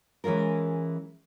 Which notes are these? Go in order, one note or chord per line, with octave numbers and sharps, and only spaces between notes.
E3 G#3 C#4 F4 A#4